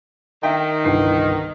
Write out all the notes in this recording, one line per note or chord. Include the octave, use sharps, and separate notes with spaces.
D#3 E5 G5
G1 C2 C7